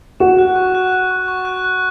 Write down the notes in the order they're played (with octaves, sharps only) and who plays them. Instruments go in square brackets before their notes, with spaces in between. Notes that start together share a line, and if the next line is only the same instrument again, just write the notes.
[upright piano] F#4 [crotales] E7
[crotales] F#6
C#6
F#6
F#6
C#6
C#6
F#6
F#6